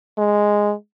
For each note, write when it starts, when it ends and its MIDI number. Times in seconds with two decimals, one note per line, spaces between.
0.18 0.74 56